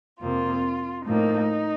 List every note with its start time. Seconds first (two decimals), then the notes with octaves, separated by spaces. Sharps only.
0.21 F2 C3 F3 A#3 F4
1.06 A2 F3 A#3 D#4